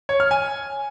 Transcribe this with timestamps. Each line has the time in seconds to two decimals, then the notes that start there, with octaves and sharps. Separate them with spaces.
0.09 C#5
0.20 F6
0.31 G#5